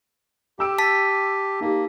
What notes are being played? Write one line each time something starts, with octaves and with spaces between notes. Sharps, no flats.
G4 G5 E6 D7
A5 B6
A#3 D#4 G4